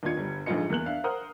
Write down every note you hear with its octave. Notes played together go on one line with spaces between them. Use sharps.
D#2 D4 D#4 F4 G#6 C#7
G1 G3
A#1 G#2 D3 F4 D#5 C#7
E2 A#3 F#6 F#7
D4 E5 F5
A#4 C5 F#5 A#5 D#6 F6